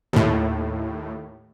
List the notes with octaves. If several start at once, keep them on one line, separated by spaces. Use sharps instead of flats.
D#2 A2